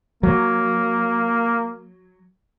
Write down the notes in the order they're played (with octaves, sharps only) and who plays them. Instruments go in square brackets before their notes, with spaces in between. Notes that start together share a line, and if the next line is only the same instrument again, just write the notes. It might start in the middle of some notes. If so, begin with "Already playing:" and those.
[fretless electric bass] F#3 [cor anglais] A#3